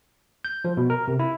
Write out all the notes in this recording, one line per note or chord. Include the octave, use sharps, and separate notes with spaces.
G6
F3
B2
A#4
C3
E4